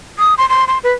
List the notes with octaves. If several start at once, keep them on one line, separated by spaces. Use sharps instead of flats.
D#6
C6
C6
C6
B4